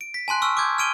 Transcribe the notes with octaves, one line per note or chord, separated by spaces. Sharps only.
D7
B6
G#5 A5 C6 F#6
C#6 E6 F6
D6 D#6 G6 G#6
F6 G#6 D7 D#7 G7